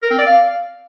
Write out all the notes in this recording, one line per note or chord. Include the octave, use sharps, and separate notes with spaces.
A#4
C4
D5
F5